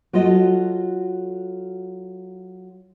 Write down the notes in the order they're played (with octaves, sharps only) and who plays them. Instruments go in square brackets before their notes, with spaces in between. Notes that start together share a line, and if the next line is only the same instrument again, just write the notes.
[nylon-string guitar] F#3 F4 F#4 A4 D#5